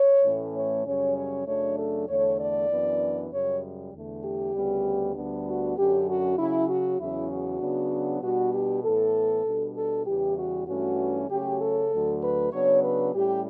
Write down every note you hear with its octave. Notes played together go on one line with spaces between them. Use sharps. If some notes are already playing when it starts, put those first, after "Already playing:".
Already playing: C#5
A2 E3 A3 C#4
C#5
F#2 C#3 G3 C#4 C#5
C#5
F#2 C#3 F#3 A3 D4 C#5
A4
E2 D3 A3 C#5
D5
F#2 E3 B3 D4
F#2 C#3 G3 C#5
E2 D3 A3
G4
D2 C#3 G3 B3
D2 D3 G3 B3 D4
F#4
F#2 D3 F#3 C#4 G4
F#4
C#3 F#3 C#4 E4
F#4
E2 C#3 F#3 C#4 E4
F#4
C#3 F#3 B3 D4
B2 G3 B3 D4 F#4
G4
A2 E3 B3 A4
B2 G3 D4
A4
E2 C#3 E3 G3 G4
F#4
G2 E3 A3 C#4 F#4
C#3 F#3 A3 C#4 G4
A4
D2 D3 F#3 A3
B4
C#3 F#3 B3 D4 C#5
B4
A2 G3 C#4 G4